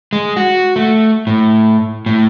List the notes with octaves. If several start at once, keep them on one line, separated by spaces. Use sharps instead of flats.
G#3
F#4
A3
A2
A2